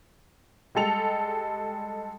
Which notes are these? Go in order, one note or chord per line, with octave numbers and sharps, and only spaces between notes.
G3 G#3 A4 F7